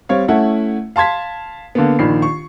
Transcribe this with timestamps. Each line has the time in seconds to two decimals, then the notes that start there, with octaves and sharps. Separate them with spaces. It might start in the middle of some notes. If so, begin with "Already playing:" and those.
0.09 G3 C4 C#5 F5
0.28 A3 C#4 E4 F#5
0.96 F5 A5 C6 G#6 B6
1.75 D3 A#3 B3
1.99 A#1 D#3 B5 C7
2.22 C#6